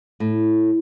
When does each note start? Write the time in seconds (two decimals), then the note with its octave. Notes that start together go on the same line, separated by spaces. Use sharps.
0.20 A2